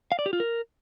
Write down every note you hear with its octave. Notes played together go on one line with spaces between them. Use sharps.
F5
D5
G4
F4
A#4